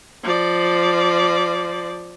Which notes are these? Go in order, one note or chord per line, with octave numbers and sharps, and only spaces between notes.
F3 D5